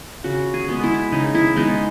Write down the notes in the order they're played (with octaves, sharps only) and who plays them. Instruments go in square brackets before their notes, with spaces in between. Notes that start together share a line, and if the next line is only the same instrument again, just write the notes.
[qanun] C#3 F#4
G#4
G#3 B3
E4
C#3 D#4
E4
G#3 B3 D#4